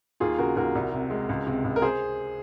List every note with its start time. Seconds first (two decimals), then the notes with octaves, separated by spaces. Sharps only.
0.20 D#2 F4 G#4
0.39 C#3 F#4 A#4
0.56 D#2 F#4 A#4
0.75 C2
0.93 C3
1.10 G#3
1.29 C#2
1.47 C3
1.64 C#2
1.76 A#4
1.82 G#4 C5